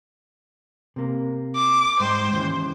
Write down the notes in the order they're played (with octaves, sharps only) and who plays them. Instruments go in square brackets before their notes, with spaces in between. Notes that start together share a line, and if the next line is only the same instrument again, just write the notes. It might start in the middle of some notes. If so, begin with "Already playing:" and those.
[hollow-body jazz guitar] C3 A#3
[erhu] D6
[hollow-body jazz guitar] G#2 G#3 G5 [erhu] C5
[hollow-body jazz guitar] D#2 C#3 E3